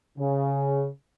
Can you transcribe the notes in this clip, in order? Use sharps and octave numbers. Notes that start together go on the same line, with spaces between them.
C#3